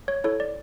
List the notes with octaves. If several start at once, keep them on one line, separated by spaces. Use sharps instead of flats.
C#5
E4 A4 C#5
D5